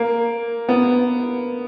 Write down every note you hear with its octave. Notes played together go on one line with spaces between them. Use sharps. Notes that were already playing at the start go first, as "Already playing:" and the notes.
Already playing: A#3
B3